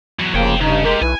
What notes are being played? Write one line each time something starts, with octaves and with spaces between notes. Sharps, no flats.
E2 F#3
F1 C#3 F3 A#3 C#5 G5
G2 C#3 D#4
G#3 A#3 G4 A#4
B1 E4 B4 G#5